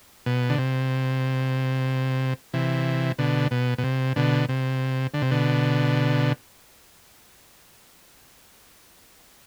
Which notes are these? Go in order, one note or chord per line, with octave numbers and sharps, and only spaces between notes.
B2
D3
C3
C3 E3
B2 D3
B2
B2
C3
B2 D3
C3
D3
C3
B2 D3